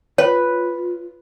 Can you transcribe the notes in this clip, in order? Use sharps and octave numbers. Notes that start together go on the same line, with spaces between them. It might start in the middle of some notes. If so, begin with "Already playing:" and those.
F4 B4 C#5